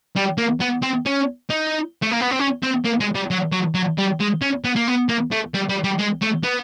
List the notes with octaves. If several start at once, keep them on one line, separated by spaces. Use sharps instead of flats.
G3
A#3
B3
C4
C#4
D#4
A3
A#3
B3
C4
C#4
C4
A#3
G#3
G3
F#3
F#3
F#3
G3
G#3
C#4
B3
A#3
B3
A#3
A3
G3
G3
G3
G#3
A3
B3